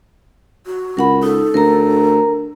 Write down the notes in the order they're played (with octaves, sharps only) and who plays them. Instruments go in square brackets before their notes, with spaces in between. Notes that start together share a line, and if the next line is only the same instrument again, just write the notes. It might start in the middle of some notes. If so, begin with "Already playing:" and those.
[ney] F#4
[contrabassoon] C#2 [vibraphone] A#4 F#5 B5
[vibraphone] D#4 [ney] A4
[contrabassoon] D2 [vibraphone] A#4 A#5